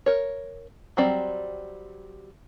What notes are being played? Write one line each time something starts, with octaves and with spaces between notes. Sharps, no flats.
A#4 C#5
F#3 G3 C4 D5